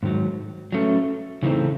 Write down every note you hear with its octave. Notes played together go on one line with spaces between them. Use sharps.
G#2 D#3 F#3
F#3 A3 C#4
C#3 E3 A3 C4 D#4